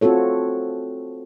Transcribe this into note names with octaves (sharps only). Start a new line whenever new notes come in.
C4 F4 F#4 A4 C#5